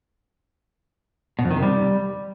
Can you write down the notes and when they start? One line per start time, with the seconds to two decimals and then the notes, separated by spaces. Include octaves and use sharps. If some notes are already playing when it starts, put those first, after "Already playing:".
1.39 B2
1.45 F2
1.51 D#3
1.57 C3
1.63 G3